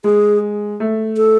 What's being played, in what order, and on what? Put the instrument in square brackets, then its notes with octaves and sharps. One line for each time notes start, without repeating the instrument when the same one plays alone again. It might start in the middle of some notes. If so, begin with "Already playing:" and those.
[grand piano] G#3 [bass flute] G#4
[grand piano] A3
[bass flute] A4